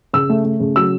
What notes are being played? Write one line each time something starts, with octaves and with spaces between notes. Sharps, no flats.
C#3 E6
A3
A3
C#3
F#3 E6